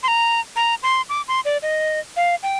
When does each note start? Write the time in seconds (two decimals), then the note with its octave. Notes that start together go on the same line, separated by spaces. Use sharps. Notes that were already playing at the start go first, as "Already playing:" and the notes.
0.03 C6
0.08 A#5
0.56 A#5
0.83 C6
1.09 D6
1.28 C6
1.45 D5
1.62 D#5
2.17 F5
2.43 G5